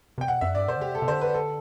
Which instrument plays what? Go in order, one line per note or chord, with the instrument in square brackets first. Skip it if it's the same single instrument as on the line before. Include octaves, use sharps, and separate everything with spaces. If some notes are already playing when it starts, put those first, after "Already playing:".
[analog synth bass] C3 [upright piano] G5
[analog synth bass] B2 [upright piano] F#5
[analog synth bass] F#2 [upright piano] E5
[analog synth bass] G2 [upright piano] D5
[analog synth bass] B2 [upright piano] C5
[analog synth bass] D3
[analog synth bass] C3 [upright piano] G4
[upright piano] A4
[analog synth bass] C3
[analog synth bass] D3 [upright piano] C5
[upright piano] B4
A4